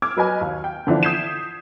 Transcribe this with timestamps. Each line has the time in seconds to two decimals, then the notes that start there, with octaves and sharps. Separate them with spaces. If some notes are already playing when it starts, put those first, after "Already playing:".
0.02 D6 E6 F6 G#6
0.17 F#3 B4 D#5 G#5
0.41 D#2
0.64 G5
0.87 D3 E3 F3 D4
1.03 D#6 G6 G#6 B6 C7 E7